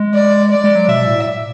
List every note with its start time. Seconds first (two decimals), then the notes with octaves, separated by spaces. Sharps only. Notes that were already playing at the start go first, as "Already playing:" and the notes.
Already playing: G#3
0.14 D5
0.51 D5
0.64 G#3
0.75 F#3
0.88 B2 E5
1.06 A2